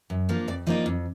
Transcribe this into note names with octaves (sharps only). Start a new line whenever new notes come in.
F#2
F3 A#3 D4 F4
F2 D5
F3 A#3 D#4 D5
F2